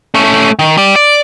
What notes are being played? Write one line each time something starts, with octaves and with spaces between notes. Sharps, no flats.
A3 C#4
D#3
G4 D5
D5